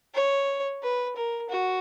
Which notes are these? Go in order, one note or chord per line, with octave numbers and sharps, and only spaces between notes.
C#5
B4
A#4
F#4